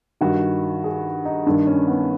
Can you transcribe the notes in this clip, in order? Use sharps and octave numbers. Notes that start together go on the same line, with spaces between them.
G2 D#3 F#4
G#4
D#4
G2 D#3 D4
C#4
B3